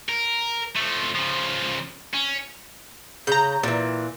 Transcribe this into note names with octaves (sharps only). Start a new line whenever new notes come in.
A#4
F3 A3
C#3 F3
C#4
C#3 A#5 G6
A#2 E3